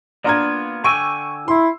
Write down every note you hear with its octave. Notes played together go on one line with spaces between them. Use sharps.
A#3 B3 D4 F4 A#5 G#6
D3 G5 G#5 C#6 E6
E4 C6